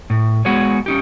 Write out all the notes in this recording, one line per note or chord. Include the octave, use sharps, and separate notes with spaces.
A2
G#3 B3 F#4 G#4 C#5
C#4 D#4 G4